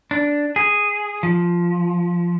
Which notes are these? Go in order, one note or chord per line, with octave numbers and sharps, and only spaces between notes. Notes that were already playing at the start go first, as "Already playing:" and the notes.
D4
G#4
F3